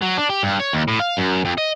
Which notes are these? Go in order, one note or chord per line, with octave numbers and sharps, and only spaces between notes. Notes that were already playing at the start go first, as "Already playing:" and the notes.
F#3
D4
G4
G2
C#5
D#2
A2
F5
F#2
F2
D#5